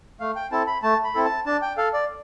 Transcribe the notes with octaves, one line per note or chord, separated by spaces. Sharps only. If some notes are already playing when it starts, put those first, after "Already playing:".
A3 F5
G5
C4 E4 A4 A5
B5
A3 A5
B5
C4 E4 A4
A5
D4 A5
G5
A4 F5
D5